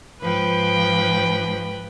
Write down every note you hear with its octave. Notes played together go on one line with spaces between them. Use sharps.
G#2 F3 B4 G5